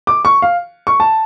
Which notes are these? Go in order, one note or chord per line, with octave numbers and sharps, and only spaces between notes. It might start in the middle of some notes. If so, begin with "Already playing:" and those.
D6
C#6
F5
C#6
A5